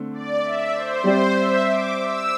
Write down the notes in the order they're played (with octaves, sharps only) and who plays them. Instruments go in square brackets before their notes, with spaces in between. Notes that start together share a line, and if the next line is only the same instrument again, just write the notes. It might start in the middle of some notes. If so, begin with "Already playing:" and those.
Already playing: [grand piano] D3 A3 C4
[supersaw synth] D5
E5
C5
[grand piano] G3 C4 G4 D5 [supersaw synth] C5
[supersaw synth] E5
D6
E6